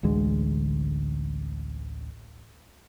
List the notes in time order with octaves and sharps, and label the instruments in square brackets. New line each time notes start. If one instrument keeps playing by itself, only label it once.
[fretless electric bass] A1 D2 D3 G#3